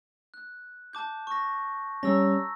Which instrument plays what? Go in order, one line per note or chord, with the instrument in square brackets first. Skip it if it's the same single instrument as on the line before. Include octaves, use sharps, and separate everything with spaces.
[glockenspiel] F#6
A5 D6 G6
C#6 A#6
[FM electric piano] G3 C#4 [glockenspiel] A#5 E6 A#6